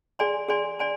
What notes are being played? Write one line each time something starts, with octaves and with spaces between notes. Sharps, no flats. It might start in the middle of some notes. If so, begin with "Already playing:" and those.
G#4 D5 G#5 C6
G#4 D5 G#5 C6
D5 G#5 C6